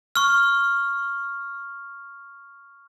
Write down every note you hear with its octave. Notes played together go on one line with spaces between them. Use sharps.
C#6 F6